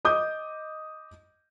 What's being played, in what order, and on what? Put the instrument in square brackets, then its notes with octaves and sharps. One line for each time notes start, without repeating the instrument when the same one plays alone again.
[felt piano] D#5 D6 D#6 G6